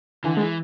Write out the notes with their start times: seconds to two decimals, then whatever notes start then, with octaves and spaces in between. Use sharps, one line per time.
0.24 D3 E3
0.37 G#3
0.40 E3